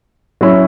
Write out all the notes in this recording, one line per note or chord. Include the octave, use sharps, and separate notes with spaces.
F#3 C#4 E4